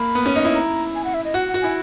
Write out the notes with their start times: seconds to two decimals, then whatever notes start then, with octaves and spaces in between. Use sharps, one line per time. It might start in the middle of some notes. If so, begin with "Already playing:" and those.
Already playing: A#3 B5
0.15 B3
0.26 C#4
0.36 D#4
0.45 E4
0.55 A#5
0.95 G#5
1.04 F#5
1.14 E5
1.25 D#5
1.34 F#4 F#5
1.48 F#5
1.54 F#4
1.62 E4 G#5